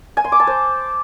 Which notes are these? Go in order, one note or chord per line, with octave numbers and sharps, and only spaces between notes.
G#5
C6
D6
A5
C5